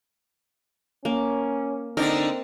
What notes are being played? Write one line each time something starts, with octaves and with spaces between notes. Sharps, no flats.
A#3 C#4
D3 C4 D4 D#4 A#4